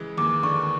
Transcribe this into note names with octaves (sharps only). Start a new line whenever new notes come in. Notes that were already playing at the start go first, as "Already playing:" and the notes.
Already playing: C#3 E3 G#3
D#2 D6
D3 C#6